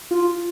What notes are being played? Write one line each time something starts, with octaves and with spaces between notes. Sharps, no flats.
F4